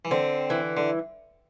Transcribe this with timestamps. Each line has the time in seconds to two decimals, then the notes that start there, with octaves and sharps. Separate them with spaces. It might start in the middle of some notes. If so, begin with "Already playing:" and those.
0.05 E3
0.11 D3 C4
0.50 E3
0.77 D3